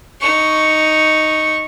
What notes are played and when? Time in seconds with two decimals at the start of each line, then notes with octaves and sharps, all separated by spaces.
0.21 D#4 C#6